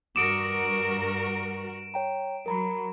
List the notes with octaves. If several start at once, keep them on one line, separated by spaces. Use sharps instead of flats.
G2 F#4 A#4 D6 D#6 C#7 D7 E7
C#5 G5 A#5
F#3 A#4 A#5 B5